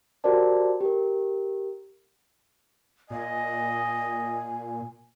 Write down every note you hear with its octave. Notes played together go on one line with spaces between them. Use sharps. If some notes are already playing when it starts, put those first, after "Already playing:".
F#4 G4 A#4 C5 D5 A5
G4 A#4
A#2 D#5 G#5